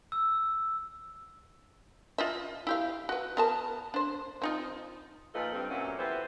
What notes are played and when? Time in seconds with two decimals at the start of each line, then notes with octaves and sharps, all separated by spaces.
0.12 E6
2.18 F4 D#5 E5
2.67 E4 G4 F5
3.09 F#4 B4
3.37 B3 A#4 A5
3.94 D4 C5
4.42 C4 D#4 F4
5.34 A#2 F3 D#4 F4 A4 B4
5.54 G2 C4
5.69 F#2 A#2 F#3 A3 A#3 C#4
5.99 E3 B3 E4 G4 C5